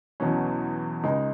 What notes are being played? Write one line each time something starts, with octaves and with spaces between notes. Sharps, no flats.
E2 B2 F#3 C#4
C#2 C#3 G#3 D#4